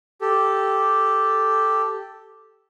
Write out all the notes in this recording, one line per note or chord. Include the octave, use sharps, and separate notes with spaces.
G4 A4